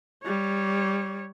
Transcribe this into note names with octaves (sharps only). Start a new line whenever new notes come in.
G3 C#5